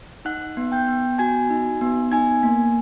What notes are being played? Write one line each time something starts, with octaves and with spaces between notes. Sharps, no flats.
D#4 F#5 F#6
B3
G5 G6
B3
F#4 G#5 G#6
D#4
B3
D#4 G#5 G#6
A#3